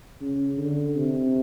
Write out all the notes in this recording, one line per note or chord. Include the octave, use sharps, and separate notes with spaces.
C#3
D3
C3